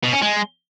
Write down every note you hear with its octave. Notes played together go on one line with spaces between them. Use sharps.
B2
C#4
G#3